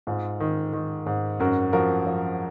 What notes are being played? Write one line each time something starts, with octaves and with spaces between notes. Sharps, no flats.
G#2 F4 G#4
D#3
D#3
G#2
F#2 F#4 A#4
F3 F#4 A#4
F3